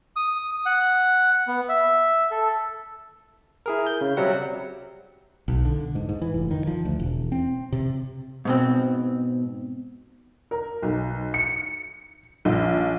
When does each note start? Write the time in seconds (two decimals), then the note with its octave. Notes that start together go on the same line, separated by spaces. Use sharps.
0.16 D#6
0.66 F#5
1.48 B3
1.69 E5
2.31 A4
3.66 E4 G#4 A#4
3.87 G6
4.01 C#3
4.17 C3 F#3 G3 C4 F#5
5.48 B1
5.65 D3
5.95 G#2
6.09 G#2
6.22 E3
6.34 F1
6.51 D#3
6.67 F3
6.85 D2
7.00 E1
7.32 C4
7.72 C3
8.45 G#2 B2 C4
10.51 A#4
10.82 B1
11.34 C#7
12.45 A#1